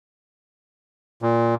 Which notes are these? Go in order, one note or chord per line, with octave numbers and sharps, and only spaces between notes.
A#2